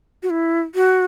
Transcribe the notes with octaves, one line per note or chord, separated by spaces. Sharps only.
F#4
E4
F#4